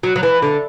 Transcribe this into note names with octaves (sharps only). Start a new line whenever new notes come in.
F#3
F#3
E3
D3